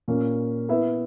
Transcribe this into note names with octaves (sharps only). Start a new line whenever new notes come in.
A#2 A#3 C#4
B3 E4 B4 E5